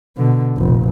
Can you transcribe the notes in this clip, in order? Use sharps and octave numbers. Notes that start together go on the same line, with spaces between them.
B2 D3
F1 A#1